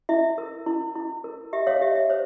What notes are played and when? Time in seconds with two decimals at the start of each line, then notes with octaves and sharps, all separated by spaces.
0.09 E4 E5
0.38 A#4
0.66 E4
0.95 E4
1.24 A#4
1.53 G4 E5
1.67 C#5 F5
1.82 G4 E5
1.95 E5
2.10 C5 C#5